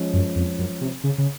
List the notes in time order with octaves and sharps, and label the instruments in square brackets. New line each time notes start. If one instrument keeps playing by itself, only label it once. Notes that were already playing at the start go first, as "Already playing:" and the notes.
Already playing: [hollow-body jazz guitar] F3 G#3 C#4
[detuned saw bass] F#2
F2
F#2
C3
C#3
C#3